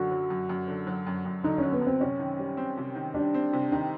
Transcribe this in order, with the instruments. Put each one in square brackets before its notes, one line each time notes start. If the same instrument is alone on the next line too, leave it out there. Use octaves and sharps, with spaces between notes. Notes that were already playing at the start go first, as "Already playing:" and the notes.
Already playing: [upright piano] F#2 D3 [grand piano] F#4
[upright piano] F#3
F#2
F#2
D3
F#3
F#2
F#2
[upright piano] D3 [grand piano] D#4
[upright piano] F#3 [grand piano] C#4
[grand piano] B3
[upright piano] F#2
[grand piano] C4
[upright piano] C3 [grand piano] C#4
[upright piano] D#3
G3
C4
C3
D#3
[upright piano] G3 [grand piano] D4
[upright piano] C4
C3
[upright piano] D#3 [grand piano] D#4